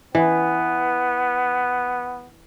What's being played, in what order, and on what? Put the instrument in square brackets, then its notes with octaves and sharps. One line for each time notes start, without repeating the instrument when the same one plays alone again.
[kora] E3 [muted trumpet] B3